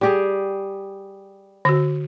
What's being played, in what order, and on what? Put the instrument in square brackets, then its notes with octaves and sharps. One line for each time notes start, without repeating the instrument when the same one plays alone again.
[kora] G3 G4 G#4
[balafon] D3 F#4